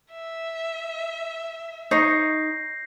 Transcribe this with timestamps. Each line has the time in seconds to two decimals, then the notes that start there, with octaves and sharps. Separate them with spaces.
0.13 E5
1.91 D#4 C#5 G6 A#6 C7